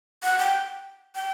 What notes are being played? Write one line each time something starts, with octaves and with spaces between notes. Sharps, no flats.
F#5
G5
G5